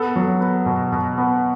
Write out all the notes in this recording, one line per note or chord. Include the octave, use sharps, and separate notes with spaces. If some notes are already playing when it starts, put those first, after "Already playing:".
Already playing: B3 A4
F#3
B3
B2
B2
B3